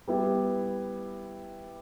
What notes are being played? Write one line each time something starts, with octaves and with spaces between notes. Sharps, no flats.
G3 B3 E4 G4